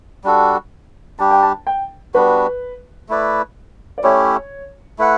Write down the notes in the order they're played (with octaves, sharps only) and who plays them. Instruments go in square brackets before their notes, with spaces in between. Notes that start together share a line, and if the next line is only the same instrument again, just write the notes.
[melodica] G3 D4 F#4 A4
[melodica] G3 D4 G4 [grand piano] A5
[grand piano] G5
A5
G5
[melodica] G3 B3 D4 F#4 [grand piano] B4
[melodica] A3 E4 B4 D5
[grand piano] D5
[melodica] A3 C#4 E4 G4 [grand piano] C#5
[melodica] A3 E4 B4 F#5